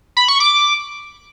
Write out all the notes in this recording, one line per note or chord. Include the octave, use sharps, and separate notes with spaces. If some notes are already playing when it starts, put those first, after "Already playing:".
B5
C#6
D6